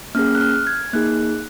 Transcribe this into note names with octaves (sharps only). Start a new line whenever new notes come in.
A#3 C#4 G#4 F6
F#6
F6
G#6
A#3 D#4 G#4 F#6